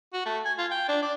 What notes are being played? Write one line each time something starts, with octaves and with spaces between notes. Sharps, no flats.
F#4
A3
G#5
F4
G5
D4
D5